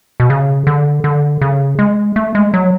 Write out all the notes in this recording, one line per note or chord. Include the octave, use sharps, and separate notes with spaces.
B2
C#3
D3
D3
C#3
G#3
A3
G#3
F#3